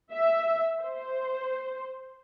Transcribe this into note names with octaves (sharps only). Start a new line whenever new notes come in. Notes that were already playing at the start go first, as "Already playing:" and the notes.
E5
C5